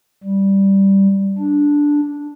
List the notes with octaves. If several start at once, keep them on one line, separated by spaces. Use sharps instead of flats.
G3
D4